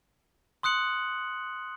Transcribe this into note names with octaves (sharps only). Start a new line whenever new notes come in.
C6 D#6 F#6 C#7 F#7